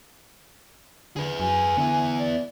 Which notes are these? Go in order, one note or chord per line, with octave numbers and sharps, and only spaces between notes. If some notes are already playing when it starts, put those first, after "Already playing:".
D3 G#4 B4
F#2 G#5
D3 B3 E4
D5